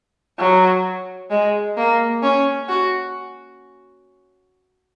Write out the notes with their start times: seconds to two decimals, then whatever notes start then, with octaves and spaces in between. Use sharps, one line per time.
0.39 F#3
1.31 G#3
1.77 A#3
2.23 C#4
2.69 F#4